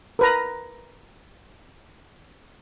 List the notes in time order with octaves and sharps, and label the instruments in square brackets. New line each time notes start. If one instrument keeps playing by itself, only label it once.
[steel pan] A#4 B4 A#5